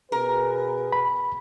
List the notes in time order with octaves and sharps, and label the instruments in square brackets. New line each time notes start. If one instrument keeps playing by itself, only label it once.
[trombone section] B2 G#4 B4 [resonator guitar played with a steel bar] A#4
[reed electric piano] B5